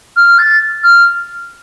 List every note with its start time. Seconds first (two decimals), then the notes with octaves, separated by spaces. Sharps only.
0.16 F6
0.39 A6
0.83 F6